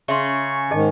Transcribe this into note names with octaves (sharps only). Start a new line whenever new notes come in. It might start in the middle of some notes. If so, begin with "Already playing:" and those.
C#3 E5 C6 C#6
G#2 D#3 G#4 D#5 A5